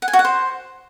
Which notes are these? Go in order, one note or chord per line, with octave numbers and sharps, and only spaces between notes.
F#5
G#5
F#4
F#5
C5